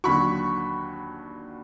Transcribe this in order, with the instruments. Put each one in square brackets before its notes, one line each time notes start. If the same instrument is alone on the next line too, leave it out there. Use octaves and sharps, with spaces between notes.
[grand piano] D#2 D3 F#3 B5 C#6